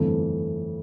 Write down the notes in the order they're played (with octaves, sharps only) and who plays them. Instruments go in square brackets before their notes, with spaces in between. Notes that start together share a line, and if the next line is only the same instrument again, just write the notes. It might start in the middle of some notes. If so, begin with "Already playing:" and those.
Already playing: [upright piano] G1 F2 E3 A3